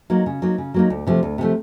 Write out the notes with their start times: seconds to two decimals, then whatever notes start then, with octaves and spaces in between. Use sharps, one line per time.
0.10 F#3 A#3 D#4
0.26 C#3
0.42 F#3 A#3 D#4
0.58 C#3
0.74 F#3 A#3 D#4
0.90 D2
1.07 C3 F3 A3
1.23 D2
1.38 C3 F3 A3